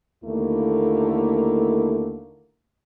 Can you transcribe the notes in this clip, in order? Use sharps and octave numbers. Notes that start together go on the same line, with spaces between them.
D#2 D3 A3 A#3 E4